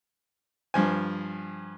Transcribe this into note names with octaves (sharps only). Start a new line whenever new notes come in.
G2 F3 G#5